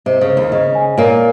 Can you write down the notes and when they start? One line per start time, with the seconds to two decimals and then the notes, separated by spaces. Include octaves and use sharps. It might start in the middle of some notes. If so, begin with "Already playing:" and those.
0.06 C3 D#5
0.21 C#3
0.29 C5
0.37 D#2 D#3
0.52 C#3 D#5
0.75 G#5
0.98 A#2 A#3 C#5